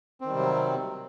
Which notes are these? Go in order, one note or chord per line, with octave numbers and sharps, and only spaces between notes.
C3 D#3 F#3 G3 C4